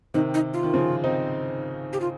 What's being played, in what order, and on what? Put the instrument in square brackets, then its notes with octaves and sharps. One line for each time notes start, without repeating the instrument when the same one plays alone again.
[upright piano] C3 D#3 [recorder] D#4
[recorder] D#4
F4
[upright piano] D#3
C#3 F3
C4 D#4
[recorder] G4
F4